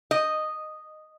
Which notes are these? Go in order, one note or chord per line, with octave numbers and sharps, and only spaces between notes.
D#5